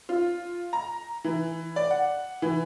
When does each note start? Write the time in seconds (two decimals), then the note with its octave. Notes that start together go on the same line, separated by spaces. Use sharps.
0.09 F4
0.73 A#5
1.24 E3
1.76 D5
1.91 F#5
2.42 E3